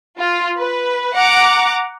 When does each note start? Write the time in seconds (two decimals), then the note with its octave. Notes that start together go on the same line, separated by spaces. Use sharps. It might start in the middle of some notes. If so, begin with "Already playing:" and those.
0.19 F4
0.58 B4
1.16 F#5 A#5 D6